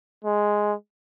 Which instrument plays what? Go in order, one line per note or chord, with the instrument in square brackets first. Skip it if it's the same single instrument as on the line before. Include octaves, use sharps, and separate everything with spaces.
[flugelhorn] G#3